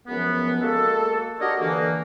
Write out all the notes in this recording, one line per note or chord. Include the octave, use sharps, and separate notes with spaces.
C#2 F#2 F3 B3
G#3 A#3 F#4 A4
D4 F#4 G4 A#4 C#5 D#5
D3 E3 A#3